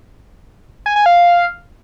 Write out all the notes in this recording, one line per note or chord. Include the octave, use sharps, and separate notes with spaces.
G#5
G#5
F5